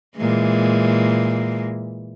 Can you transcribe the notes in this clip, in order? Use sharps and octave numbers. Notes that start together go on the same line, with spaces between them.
A#2 E3 G#3